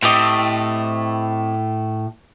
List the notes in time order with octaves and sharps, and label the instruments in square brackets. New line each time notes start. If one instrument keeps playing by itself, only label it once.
[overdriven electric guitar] A2 [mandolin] C4 G4 D#5